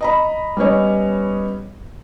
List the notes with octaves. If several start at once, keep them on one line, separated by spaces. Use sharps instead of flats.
D#5 A#5 B5
G3 B3 C#4 B4 C#5 D#5